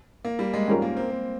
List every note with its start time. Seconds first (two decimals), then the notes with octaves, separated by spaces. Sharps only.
0.25 A#3
0.39 G3
0.54 G#3
0.68 G#2 G3 C#4 F4 A#4
0.82 A#3
0.97 C4
1.11 A#3